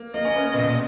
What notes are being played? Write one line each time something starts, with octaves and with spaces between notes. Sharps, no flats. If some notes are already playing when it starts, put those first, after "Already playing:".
Already playing: A#3
A#3 D#5
C#4
B3
C#3
A#2
B2
A#2